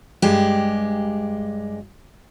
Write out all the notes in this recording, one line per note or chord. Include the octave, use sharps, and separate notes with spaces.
G2 G#3 G4